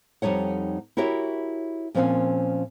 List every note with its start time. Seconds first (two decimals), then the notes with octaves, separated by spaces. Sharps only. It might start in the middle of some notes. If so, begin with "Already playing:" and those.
0.22 F2 G3 D#4 C#5 F#5
0.97 E4 F#4 G4 A#4 C#5 E5
1.94 A#2 F3 A#3 C4 C#4 F5